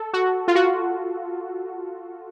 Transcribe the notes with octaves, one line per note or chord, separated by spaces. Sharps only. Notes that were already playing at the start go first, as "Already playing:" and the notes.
Already playing: A4
F#4
F4
F#4